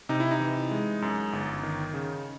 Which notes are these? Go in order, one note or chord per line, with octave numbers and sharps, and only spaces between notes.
C3 D#4
E4
D#4
E3
G#3
F#2
G1
D#3
C#3